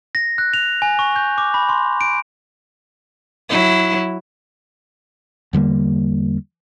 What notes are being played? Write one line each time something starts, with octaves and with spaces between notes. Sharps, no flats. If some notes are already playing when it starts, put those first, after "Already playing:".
A#6
F#6
F7
G#5
C#6
G6
D6
B5
C6
D7
F#3 E4
E2 D3 G3 A#3